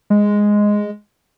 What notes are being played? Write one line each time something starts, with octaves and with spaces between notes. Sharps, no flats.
G#3